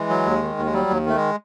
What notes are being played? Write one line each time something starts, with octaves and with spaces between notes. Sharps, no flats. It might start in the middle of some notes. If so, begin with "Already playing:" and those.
Already playing: E3 G#3
F#3
D#2
D#3
D#2
G#3
F#3 G3
D#2
D#3 A3
G#3